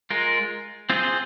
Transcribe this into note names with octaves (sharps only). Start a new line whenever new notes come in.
G#3 F4 A#4
C4 F4 G#4 C5